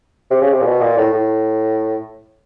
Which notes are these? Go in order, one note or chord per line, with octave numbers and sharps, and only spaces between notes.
C3
C#3
C3
A#2
B2
A#2
A2
A2